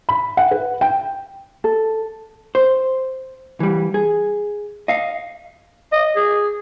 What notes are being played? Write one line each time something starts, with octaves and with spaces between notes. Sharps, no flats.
B5
F#5
B4
G5
A4
C5
E3 G3
G#4
D#5 F5
D#5
G#4